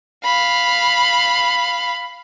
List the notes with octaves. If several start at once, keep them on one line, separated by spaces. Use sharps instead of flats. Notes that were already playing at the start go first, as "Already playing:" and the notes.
F5 B5